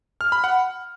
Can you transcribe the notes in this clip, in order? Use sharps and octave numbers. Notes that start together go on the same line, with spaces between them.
F6
B5
F#5